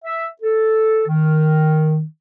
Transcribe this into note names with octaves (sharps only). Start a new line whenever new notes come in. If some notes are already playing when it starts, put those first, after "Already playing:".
E5
A4
D#3